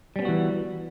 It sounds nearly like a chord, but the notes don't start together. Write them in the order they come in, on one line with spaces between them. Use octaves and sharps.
G3 C#4 B3 F#4 E3